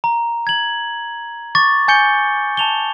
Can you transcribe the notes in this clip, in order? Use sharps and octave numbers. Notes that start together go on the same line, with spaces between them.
A#5
G#6 F#7
C#6 D6 A6
G#5 G6 C#7 G7
A5 F7 G7